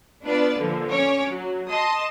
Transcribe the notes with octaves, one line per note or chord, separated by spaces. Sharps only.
B3 D4 F4 B4 D5
A#2 D3 F3
C#4 C#5 D6
F#3
D#5 A5 C6 D#6